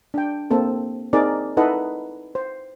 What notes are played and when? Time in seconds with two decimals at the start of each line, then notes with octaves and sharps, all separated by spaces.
0.14 D4 G5
0.51 A#3 C4 A4
1.13 C4 D#4 G#4 A#4 D5
1.57 D#4 E4 A4 B4 D#5 F#5
2.35 C5